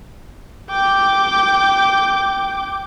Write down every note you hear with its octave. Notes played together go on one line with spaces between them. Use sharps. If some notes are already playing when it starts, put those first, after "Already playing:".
G5 D6